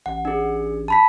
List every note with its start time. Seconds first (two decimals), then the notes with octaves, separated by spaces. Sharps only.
0.06 A1 F#5
0.25 D4 G#4
0.88 A5 B5 B6